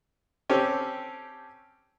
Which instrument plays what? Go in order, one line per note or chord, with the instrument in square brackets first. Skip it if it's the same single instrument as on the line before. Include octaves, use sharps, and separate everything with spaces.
[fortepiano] C4 C#4 G4 A4